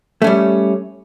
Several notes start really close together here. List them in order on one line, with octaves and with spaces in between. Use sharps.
A3 C#4 G3